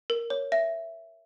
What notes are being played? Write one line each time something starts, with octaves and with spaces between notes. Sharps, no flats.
A#4
C#5
E5